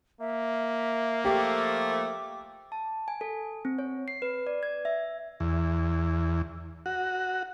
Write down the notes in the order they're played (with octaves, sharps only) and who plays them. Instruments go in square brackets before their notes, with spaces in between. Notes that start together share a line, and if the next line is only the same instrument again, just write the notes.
[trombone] A#3 [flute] E5
[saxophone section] F3 A3 [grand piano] G4 [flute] D6
[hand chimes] A5
G#5
A4
C4
C#5
C7
B4
D5
G#6
E5
[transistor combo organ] E2
F#4